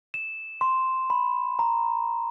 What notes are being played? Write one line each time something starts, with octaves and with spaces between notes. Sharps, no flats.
E7
C6
B5
A#5